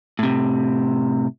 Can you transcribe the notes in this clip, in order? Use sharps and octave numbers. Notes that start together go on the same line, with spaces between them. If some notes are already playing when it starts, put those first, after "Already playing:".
A2 C3